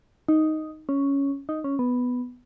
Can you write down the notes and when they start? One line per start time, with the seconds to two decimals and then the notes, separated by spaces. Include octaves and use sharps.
0.28 D#4
0.89 C#4
1.49 D#4
1.64 C#4
1.79 B3